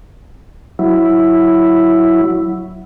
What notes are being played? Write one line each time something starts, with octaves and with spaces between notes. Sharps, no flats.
F#3 E4